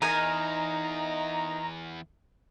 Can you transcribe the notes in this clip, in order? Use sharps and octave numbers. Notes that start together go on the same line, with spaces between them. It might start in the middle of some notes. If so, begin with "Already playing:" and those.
E2 D#4 A#4 G#5 A#5